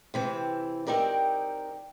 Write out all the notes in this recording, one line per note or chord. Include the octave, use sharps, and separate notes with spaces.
C3 E3 C4
C4 D#4 G4 A#4 D5